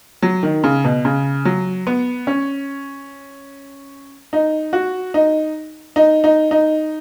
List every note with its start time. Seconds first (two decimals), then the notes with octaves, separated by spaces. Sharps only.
0.22 F#3
0.43 D#3
0.64 C#3
0.84 B2
1.05 C#3
1.45 F#3
1.87 B3
2.27 C#4
4.33 D#4
4.73 F#4
5.14 D#4
5.96 D#4
6.24 D#4
6.51 D#4